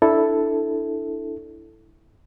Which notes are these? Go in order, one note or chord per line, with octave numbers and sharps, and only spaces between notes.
D4 E4 A4